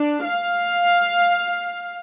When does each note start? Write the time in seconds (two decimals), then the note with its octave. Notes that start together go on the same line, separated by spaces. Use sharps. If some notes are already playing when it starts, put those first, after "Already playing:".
Already playing: D4
0.25 F5